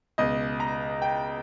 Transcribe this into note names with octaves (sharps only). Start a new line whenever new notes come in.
C#2 B2 D#5
A#5
G5